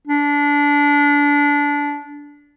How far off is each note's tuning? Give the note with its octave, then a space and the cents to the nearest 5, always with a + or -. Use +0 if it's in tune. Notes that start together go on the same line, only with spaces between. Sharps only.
D4 -20